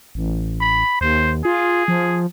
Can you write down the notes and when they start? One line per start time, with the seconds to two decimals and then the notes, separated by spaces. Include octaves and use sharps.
0.15 A1
0.61 B5
1.01 D#2 C5
1.45 F4 G#4
1.88 F3